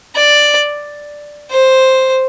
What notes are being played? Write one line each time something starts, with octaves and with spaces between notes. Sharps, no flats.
D5
C5